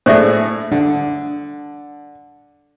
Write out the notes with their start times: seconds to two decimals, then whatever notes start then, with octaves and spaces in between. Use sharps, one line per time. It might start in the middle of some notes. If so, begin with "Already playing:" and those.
0.06 A2 A3 G#4 C5 D5 E5
0.72 D3 D4